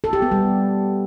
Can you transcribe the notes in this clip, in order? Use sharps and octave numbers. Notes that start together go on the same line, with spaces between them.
A4
G4
B3
G3